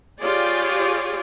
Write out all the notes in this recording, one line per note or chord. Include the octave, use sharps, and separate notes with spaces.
F4 G4 G#4 C#5 D5